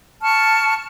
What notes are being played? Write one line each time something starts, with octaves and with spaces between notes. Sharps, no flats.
A5 C#6 F6